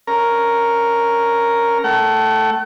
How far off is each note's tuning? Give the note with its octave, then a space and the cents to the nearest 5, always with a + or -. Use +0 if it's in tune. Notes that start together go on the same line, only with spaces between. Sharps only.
C#4 +0 A#4 +0
A3 +0 F#5 +45